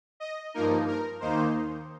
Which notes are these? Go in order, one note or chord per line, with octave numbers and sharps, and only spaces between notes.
D#5
G2 F3 A#3 D#4 A#4
A#4
D#2 D#3 A#3 D#4 C5